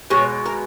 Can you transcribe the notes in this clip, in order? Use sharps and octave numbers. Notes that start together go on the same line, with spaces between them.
B2 G#3 C#5
A#4